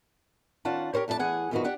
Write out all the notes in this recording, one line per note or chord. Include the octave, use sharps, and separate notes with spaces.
D#3 C#4 D4 F4 F#5 A5
G4 A#4 C5 C#5
F2 A3 D4 E4 A5
E3 G#4 F#5 G#5
E2 G2 D#3 F3 B3 F#4
D4 G4 F#5